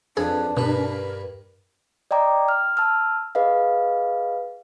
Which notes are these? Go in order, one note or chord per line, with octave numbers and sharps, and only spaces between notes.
F2 D4 G#4 B4
G2 B2 A#4 B4
D5 D#5 G5 A#5 D6
F6
A5 E6 F6
G#4 B4 D#5 F5